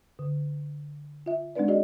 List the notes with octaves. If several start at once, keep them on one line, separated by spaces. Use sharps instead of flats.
D3
F4 E5
G#3 C4 D4 D#4 B4 D5
F#4 G#4 D5 D#5